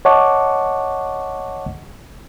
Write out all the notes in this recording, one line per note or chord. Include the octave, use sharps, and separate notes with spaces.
C#5 D#5 F#5 A5 C#6 D6